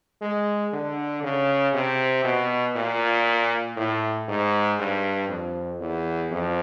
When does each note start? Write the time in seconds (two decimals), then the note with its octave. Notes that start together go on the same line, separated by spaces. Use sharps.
0.22 G#3
0.73 D3
1.23 C#3
1.74 C3
2.24 B2
2.76 A#2
3.77 A2
4.28 G#2
4.79 G2
5.29 F2
5.80 E2
6.31 F2